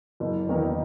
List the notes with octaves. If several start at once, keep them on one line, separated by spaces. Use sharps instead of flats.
F#1
E2 D#3 A#3 D#4